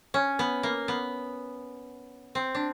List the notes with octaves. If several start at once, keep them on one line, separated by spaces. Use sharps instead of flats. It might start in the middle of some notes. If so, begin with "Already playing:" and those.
C#4
B3
A#3
B3
C4
D4